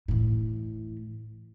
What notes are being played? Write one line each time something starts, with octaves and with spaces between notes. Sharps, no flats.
A2 E3